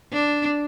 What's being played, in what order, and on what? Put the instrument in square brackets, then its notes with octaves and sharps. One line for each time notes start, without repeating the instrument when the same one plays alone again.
[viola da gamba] D4